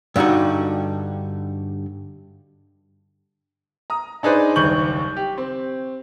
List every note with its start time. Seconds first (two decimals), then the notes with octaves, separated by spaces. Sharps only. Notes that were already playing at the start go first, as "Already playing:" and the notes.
0.16 G2 D3 G3 D#4 F#4
3.90 A#5 D#6
4.23 D4 D#4 G#4 B4 C5 D5
4.56 F#1 D#2 G3 C#6 G6 F#7
5.17 G4
5.38 C4